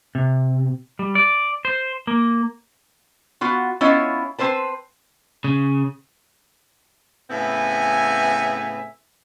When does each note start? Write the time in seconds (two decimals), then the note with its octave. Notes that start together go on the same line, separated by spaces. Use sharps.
0.15 C3
0.99 G3
1.15 D5
1.65 C5
2.07 A#3
3.41 B3 F4 F#4
3.81 B3 C#4 E4 F4 C#5 D#5
4.39 C4 B4 C5 A5
5.44 C#3
7.30 A2 C#3 B3 C4 E5 G#5